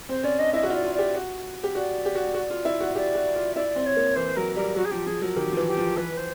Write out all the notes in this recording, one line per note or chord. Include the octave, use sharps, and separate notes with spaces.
C4 C5
C#4 D5
D4 D#5
E4 D#5
F#4
F4 D#5
D5
F4
G4 D5
F#4
G4
F#4 D5
G4
F#4
F#4
F4
E4
F#4
G4 D5
F#4
F4
E4 D5
C4
C#5
A#3
E3 C5
F#3 A#4
G3 A#4
F#3 F#4
G#4
F3 G4
F3 G#4
F#3 A#4
D#3 G4
F3
E3
G4
F3
E3 B4
C5